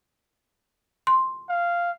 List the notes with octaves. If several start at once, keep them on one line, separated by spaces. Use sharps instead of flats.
C6
F5